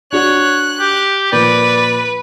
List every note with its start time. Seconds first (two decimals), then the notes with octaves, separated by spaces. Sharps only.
0.13 D4 F#4 C#5 F#6
0.80 G4
1.32 A#2 F3 B4 D5